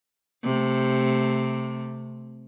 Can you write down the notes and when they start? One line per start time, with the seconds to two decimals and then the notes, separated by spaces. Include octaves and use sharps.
0.43 C3 A3